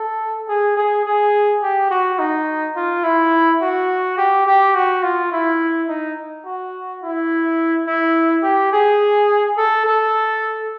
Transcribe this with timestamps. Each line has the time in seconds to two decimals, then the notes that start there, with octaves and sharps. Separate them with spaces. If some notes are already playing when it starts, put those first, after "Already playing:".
Already playing: A4
0.49 G#4
0.77 G#4
1.05 G#4
1.62 G4
1.90 F#4
2.19 D#4
2.76 F4
3.04 E4
3.62 F#4
4.18 G4
4.46 G4
4.75 F#4
5.03 F4
5.32 E4
5.89 D#4
6.45 F#4
7.02 E4
7.87 E4
8.43 G4
8.73 G#4
9.57 A4
9.86 A4